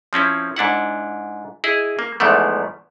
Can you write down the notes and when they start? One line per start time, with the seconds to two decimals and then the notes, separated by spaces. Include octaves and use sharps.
0.13 F3 C4 C#4 E4
0.56 G#2 D4 E4 F#5
1.64 E4 G#4 D#5
1.99 A#3
2.20 E2 G#2 E3 F3 A3